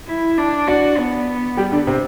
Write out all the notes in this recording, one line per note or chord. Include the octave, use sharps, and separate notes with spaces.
E4
D4
D4 F#4 D5
B3
G3 G4
D3 D4
C3 C4